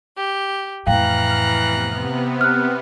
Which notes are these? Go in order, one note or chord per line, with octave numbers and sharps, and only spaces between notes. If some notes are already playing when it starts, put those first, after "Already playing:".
G4
F2 A2 E3 F5 G5 A#5 F6 F#6
C3 B3
F6 F#6